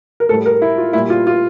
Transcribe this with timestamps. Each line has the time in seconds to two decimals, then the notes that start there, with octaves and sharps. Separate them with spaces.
0.20 A#4
0.29 A2 A4
0.33 G3
0.46 A#4
0.62 E4
0.78 F4
0.93 A#2 G3 E4
1.10 F4
1.27 F4